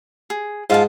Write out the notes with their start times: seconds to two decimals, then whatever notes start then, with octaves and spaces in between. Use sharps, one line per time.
0.30 G#4
0.70 G#2 F4 F5 A5